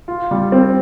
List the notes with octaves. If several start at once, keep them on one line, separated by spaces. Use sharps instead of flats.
F4
G3
C4